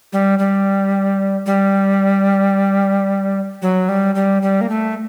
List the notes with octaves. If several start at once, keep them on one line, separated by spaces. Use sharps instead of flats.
G3
G3
G3
F#3
G3
G3
G3
A#3
A3